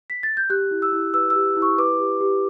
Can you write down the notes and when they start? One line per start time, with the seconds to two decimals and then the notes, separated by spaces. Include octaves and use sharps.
0.10 B6
0.23 A6
0.37 G6
0.50 G4 F#6
0.71 E4
0.82 E6
0.93 E4
1.14 B4 E6
1.30 E6
1.35 G4
1.57 E4
1.62 C#6
1.78 B4 D6
2.00 G4
2.21 G4